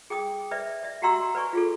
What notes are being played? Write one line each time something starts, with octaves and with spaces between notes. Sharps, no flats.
G#4 G5 D6 D#6
B4 D5 E5
D5 E5
F#4 G4 F#5 A#5 C6 E6
B4 D5 G#5 C#6
F4 G#4 A4